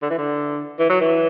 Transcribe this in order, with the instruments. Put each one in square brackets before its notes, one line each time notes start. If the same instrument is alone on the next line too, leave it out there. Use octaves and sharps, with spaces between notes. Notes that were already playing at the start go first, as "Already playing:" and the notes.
[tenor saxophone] D3
E3
D3
E3
F#3
E3